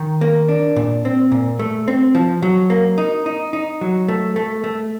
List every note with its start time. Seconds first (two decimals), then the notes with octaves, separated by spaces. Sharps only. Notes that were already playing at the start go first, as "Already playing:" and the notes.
Already playing: D#3
0.21 A#3
0.49 D4
0.76 A#2
1.05 C4
1.32 A#2
1.59 A3
1.88 C4
2.15 F3
2.43 F#3
2.70 A#3
2.98 D#4
3.26 D#4
3.53 D#4
3.81 F#3
4.08 A3
4.36 A3
4.64 A3